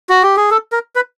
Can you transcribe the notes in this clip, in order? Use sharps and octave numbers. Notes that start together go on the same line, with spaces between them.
F#4
G4
G#4
A4
A#4
B4